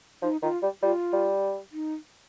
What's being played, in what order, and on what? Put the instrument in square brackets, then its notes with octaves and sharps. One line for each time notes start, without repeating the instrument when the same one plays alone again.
[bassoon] F3 [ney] D#4
[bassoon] D#3 [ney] F4
[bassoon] G3
[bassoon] G3 [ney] F4
[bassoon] G3
[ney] D#4